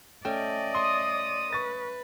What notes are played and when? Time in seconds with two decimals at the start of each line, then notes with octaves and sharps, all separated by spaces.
0.25 A3 C#4 D5 D#5 G5
0.75 C6 D#6
1.52 B4 C#6 A6